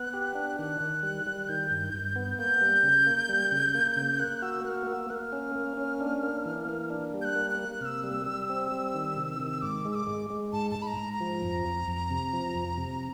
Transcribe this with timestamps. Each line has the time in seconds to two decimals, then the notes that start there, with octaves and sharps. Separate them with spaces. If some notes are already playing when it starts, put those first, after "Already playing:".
Already playing: B3 F#6
0.13 G4
0.35 D4
0.58 D#3 F#6
0.80 D#3
1.03 G3
1.27 G3
1.48 D#3 G6
1.71 G2
1.94 G2
2.16 B3
2.39 A#3 G6
2.61 G3
2.84 C#3
3.06 A#3
3.29 G3
3.52 C#3
3.75 A#3
3.96 C#3
4.19 A#3 F#6
4.42 F#4 E6
4.64 A#3 F#6
4.69 F6
4.87 A#3 E6
5.10 A#3 F6 F#6
5.33 C#4
5.56 A#3
5.77 C#4
6.01 D4
6.23 A#3
6.46 E3
6.69 A#3
6.90 D4
7.14 G3
7.22 G6
7.25 F#6
7.35 A#3
7.51 F#6
7.59 A#3
7.81 C3 F6
7.86 E6
8.04 G3
8.26 G3
8.50 C4
8.72 G3
8.95 D#3
9.17 C3
9.40 D#3
9.62 G#2 D6
9.85 G#3
9.91 E6
9.95 D6
10.07 G#3
10.30 G#3
10.53 G#2 A5
10.71 G#2 A5
10.82 B5
10.87 A#5
10.97 G#2
11.13 A#5
11.20 F3
11.43 F2
11.66 F2
11.88 F2
12.10 C3
12.33 F3
12.55 F2
12.78 C3